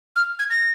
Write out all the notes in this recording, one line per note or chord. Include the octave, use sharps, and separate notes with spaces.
F6
G#6
A#6